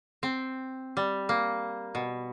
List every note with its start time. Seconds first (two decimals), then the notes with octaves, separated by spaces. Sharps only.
0.23 C4
0.97 G3
1.29 A#3
1.95 B2